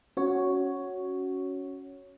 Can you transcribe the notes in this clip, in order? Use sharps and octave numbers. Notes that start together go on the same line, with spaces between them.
C#4 F#4 C#5